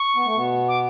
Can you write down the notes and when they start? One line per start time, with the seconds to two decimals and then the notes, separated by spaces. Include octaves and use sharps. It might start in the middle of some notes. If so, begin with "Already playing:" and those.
Already playing: C#6
0.16 B3
0.26 A3
0.36 B2 B3
0.68 D6